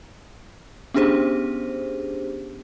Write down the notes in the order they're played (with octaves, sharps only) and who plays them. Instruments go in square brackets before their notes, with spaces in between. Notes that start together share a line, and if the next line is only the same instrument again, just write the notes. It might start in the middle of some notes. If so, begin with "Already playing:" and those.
[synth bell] B3 C#4 D4 G4 G#4 C5